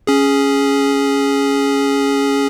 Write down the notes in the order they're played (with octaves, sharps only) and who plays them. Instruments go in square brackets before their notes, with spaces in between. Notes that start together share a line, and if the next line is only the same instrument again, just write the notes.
[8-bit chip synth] C#4 G#4